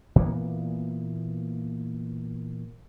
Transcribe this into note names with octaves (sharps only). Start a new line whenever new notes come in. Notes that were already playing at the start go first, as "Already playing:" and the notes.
A#2 E3 A#3 B3